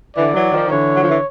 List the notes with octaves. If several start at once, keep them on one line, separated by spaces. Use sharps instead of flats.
D3 E3 D5
E3 F#3
D#3 F3
D#3
D3 E3 C#5
F#3
F3
E3